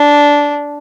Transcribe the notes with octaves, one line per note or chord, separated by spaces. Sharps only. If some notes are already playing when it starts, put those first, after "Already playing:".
Already playing: D4